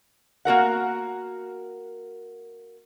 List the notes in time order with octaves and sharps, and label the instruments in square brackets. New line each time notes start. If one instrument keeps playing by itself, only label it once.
[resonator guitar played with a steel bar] A#3 F#4 A#4 F#5